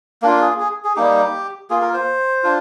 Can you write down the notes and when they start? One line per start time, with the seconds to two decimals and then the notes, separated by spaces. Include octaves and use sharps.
0.22 A#3 D4 F4
0.41 G#4
0.60 G#4
0.84 G#4
0.96 G3 A#3 D#4 G4
1.70 A#3 F4 G#4
1.81 A#4
1.94 C5
2.43 D4 F4